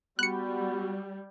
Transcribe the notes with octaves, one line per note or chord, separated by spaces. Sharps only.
G3 B3 F#4 F#6 C#7